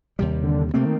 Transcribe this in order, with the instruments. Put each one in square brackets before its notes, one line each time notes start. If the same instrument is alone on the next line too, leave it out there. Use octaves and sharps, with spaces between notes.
[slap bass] D#2 C3 G3
[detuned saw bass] D3
[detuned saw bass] C3 [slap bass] A3 A#3 C4
[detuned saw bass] D#3